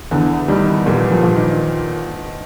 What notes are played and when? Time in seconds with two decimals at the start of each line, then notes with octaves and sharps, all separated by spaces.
0.11 E2 D3
0.48 D#3 G3
0.86 A#2 E3
1.11 F3
1.23 A#2
1.36 D#3